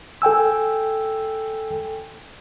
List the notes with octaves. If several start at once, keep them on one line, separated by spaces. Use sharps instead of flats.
A4 G5 G#5 E6